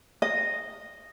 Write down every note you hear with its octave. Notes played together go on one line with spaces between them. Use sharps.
D#5